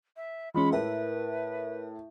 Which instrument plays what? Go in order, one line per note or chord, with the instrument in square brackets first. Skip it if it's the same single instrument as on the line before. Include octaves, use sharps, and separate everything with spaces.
[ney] E5
[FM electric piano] E3 C#4 [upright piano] G#3 F4 [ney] B5
[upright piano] A2 [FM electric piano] A#4 E5 [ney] B4